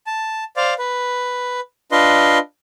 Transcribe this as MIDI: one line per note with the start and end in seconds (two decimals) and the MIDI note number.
0.07 0.44 81
0.56 0.74 72
0.56 0.74 74
0.56 0.74 77
0.79 1.60 71
1.92 2.38 62
1.92 2.38 65
1.92 2.38 71
1.92 2.38 75
1.92 2.38 84